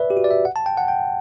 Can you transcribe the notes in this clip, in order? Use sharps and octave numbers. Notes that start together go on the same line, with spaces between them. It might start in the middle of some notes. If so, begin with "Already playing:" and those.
Already playing: B4 D5 E5
G4
F#4
D5
E5
F#5
A5
G5
F#5
G5